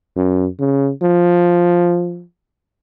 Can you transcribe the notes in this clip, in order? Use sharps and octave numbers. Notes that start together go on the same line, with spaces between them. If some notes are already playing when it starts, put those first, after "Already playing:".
F#2
C#3
F3